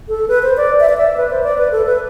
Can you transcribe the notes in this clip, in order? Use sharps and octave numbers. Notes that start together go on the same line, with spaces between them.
A4
B4
C5
D5
E5
D5
E5
B4
C5
D5
B4
A4
B4